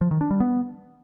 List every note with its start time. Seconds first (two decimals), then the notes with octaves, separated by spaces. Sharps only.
0.01 F3
0.11 D#3
0.21 D4
0.31 G3
0.40 B3